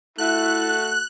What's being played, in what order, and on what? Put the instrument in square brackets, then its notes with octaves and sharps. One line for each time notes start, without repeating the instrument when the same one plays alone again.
[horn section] A3 F#4 A4 [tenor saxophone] E4 [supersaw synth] F#6